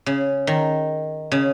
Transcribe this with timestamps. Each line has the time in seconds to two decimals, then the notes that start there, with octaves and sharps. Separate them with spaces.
0.06 C#3
0.47 D#3
1.32 C#3